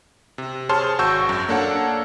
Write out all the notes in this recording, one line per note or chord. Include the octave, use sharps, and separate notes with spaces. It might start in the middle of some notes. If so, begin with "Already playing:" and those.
C3
G#4 C5 C#5 A5 C6 F6
G#1 F#4 A5 C#6 E6 G6
F#2 F#3
A#3 D4 A4 C#5 F#5